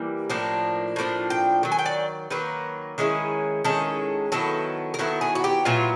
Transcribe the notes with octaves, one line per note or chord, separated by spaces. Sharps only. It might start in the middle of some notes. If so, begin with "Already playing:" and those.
Already playing: E3 G3 A#3
A2 F3 A#3 D4
A2 F3 A#3 D4
G5
D#3 F#3
G#5
G5
D5
D#3 F#3 A#3 B4
D#3 G#3 C#4 E4
D#3 G#3 C#4 E4 A4
D#3 F#3 B3 E4 A4
A#4
D#3 F#3 B3 E4 A4
G#4
F#4
G4
A#2 F#3 B3 E4 F4